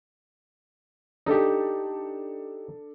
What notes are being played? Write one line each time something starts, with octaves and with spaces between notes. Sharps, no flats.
D4 D#4 G4 A4 D5